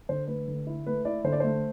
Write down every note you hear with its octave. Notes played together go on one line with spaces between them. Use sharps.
D3 C5
A3 B4
D3
E4
A3 B4
E4 D5
D3 C5
D5
A3 C5